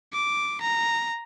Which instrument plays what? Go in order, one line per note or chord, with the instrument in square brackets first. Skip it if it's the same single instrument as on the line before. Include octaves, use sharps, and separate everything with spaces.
[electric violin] D6
A#5